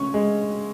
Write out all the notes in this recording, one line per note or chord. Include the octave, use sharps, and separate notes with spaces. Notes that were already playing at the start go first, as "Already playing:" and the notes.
Already playing: C#4 C#6
G#3